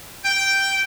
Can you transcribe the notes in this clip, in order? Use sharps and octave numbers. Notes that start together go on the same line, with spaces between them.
G5